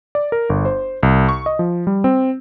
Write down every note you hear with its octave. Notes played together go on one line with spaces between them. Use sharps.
D5
A#4
G1
C5
C2
C#6
D#5
F3
G3
C4